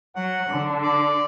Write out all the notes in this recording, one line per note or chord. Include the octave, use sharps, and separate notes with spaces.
F#3 F#5
D3
D5